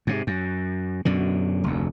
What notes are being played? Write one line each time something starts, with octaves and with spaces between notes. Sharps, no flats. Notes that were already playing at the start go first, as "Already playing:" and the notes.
G#2 C3
F#2
F#2 B2 D3
F1 D2